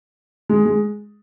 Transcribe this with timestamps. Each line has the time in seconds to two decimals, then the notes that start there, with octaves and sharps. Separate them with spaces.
0.49 G#3
0.66 G#3